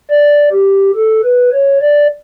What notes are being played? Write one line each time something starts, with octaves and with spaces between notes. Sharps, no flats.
D5
G4
A4
B4
C#5
D5